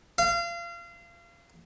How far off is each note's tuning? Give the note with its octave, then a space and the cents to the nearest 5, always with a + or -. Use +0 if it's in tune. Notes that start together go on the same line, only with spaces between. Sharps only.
F5 -30